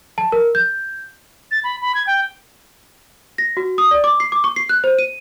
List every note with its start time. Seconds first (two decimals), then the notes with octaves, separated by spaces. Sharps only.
0.18 A5
0.32 A#4
0.55 G6
1.51 A6
1.64 B5
1.82 B5
1.95 G#6
2.07 G5
3.38 A#6
3.57 F#4
3.78 D#6
3.91 D5
4.04 D6
4.20 C7
4.32 D6
4.44 C#6
4.56 C7
4.69 F#6
4.84 C5
4.99 D#7